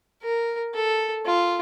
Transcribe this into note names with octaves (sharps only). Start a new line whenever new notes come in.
A#4
A4
F4